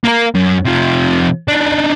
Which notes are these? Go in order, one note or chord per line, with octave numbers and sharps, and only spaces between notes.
A#3 A#4
F#2
C3 F3
D4 D#4